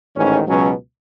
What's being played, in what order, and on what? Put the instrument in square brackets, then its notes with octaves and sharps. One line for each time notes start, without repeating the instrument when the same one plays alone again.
[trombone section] A1 G#2 D#3 C#4
C#2 B2 F#3 C#4